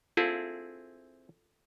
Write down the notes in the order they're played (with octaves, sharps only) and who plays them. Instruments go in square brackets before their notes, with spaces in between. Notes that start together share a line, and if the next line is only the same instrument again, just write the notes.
[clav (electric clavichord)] C4 E4 G#4 [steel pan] F4 A4 A5